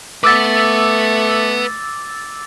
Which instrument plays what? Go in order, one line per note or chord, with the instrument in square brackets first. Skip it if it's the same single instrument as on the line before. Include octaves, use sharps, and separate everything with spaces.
[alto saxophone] A3 [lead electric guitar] B4 F#5 [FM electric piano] D6 E6 A6